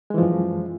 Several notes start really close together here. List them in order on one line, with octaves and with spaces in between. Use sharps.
G#3 E3 F3 F#2